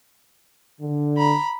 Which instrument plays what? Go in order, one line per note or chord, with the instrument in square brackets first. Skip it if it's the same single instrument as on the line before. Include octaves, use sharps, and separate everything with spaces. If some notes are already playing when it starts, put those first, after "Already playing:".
[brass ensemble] D3
[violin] A#5 B5